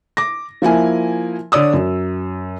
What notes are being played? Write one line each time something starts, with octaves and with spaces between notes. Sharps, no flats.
D6 A#6
F3 A#3 E4 G#5
D3 C#5 D5 D#6 E6
F#2